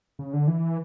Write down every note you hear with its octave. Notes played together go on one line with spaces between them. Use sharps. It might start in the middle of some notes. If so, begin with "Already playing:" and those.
C#3
D3
E3